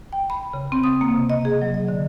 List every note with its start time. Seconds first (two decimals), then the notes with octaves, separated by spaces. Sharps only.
0.13 G5
0.30 B5
0.53 C#3
0.72 C4
0.84 D#6
1.01 A#3
1.14 C3
1.30 D#5
1.45 G#4
1.62 F#3
1.74 D#5
1.88 D3